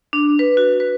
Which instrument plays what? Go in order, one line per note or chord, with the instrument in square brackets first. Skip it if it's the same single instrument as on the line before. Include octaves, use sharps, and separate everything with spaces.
[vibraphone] D4
B4
F#4
B4